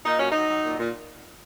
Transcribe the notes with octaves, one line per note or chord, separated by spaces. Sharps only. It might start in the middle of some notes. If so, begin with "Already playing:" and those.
A#2 D#4
F#3 C#4
F#3 D#4
F#3
A#2
A#2